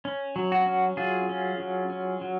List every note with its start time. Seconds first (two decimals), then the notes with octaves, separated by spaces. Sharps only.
0.05 C#4
0.36 F#3
0.52 F#4
0.66 C#4
0.97 F#3 F4 G#4
1.29 C#4
1.60 F#3
1.90 C#4
2.21 F#3